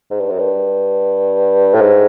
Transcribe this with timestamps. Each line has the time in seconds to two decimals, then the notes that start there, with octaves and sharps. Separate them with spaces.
0.10 G#2
0.20 G2
0.30 F#2
0.39 G2
1.74 A2
1.81 G#2